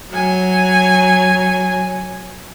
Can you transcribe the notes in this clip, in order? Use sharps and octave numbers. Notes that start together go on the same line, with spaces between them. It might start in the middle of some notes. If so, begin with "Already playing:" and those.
F#3 G#5